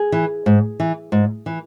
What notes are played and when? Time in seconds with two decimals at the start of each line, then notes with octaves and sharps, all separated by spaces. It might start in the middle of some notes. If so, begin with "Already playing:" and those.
Already playing: G#4
0.12 E3
0.46 G#2
0.80 E3
1.12 G#2
1.46 E3